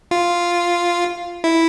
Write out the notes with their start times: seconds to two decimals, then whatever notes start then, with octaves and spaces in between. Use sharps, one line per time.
0.11 F4
1.44 E4